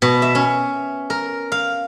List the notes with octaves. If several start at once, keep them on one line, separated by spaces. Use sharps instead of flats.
B2
E5
C#4
A#4
F5